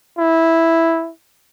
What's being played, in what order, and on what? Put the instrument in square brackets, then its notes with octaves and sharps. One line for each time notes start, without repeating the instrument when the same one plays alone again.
[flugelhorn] E4